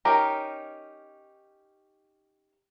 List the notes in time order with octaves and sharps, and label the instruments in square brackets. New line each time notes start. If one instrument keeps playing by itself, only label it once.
[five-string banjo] C#4 D#4 G4 A#4